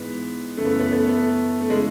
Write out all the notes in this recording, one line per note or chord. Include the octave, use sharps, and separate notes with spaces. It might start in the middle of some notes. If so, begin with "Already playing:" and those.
Already playing: G#2 E3 G#3 B3
F#2 C#3 E3 A3
B3
A3
B3
A3
B3
A3
B3
A3
A3
C#3 E3 G#3